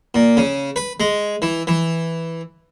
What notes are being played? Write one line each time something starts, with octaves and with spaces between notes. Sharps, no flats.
A#2
C#3
B4
G#3
E3
E3